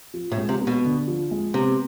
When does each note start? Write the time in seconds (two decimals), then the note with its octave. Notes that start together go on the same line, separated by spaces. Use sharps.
0.14 F3
0.32 A2
0.37 G#3
0.49 C3
0.61 B3
0.67 B2
0.84 D3
1.07 F3
1.31 G#3
1.54 C3 B3